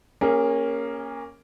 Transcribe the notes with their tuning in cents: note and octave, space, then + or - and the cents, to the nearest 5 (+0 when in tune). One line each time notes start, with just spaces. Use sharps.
A#3 +0 C#4 +0 G#4 -35